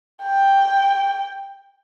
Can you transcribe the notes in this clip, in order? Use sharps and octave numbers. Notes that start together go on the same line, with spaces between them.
G5